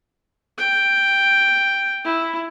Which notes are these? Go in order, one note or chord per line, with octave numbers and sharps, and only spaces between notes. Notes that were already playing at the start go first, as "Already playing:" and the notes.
G5
E4